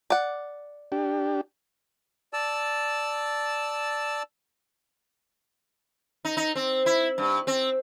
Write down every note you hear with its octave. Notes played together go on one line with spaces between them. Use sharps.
D5 F#5
D4 G4
D5 A5 E6
D#4
D#4
C4
E4
G2
C4